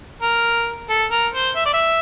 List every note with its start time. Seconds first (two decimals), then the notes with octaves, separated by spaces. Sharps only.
0.22 A#4
0.90 A4
1.11 A#4
1.34 C5
1.56 E5
1.66 D5
1.74 E5